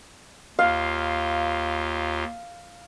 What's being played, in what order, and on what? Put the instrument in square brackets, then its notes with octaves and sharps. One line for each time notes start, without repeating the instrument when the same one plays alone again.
[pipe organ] D#2 F4 [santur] F5